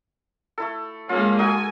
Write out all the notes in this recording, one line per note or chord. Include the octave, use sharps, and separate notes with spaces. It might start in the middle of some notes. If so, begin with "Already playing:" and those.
A3 E4 A4
G#3 A#3 C#4 F4 A4
D#4 F#4 A4 G#5